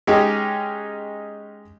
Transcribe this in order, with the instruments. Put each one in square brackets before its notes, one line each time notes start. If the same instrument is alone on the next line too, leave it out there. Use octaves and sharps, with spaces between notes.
[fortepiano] G#3 C#4 D#4 G4 G#4